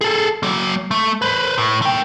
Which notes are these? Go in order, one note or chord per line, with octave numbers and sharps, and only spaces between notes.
G#4 A4
F#3 A#3
A3
B4 C5
A2
A3 G5